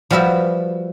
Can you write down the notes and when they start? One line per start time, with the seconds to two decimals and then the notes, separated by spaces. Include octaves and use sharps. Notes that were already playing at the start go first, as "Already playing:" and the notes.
0.10 F3 G3 F#4 B4 E5